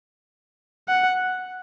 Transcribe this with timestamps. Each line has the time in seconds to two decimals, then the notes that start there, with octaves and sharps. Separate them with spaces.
0.88 F#5